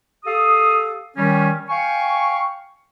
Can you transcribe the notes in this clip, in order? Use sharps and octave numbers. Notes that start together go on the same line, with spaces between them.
G4 A4 F5 D#6
D#3 G3 C#4
F5 G5 G#5 C#6